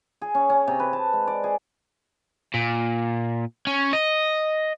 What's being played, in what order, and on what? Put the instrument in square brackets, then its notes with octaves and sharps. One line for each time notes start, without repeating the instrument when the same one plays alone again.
[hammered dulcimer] G#4
C#4
C#4
C3
B4
A5
G#3
D5
G#4
[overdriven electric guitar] A#2
C#4
D#5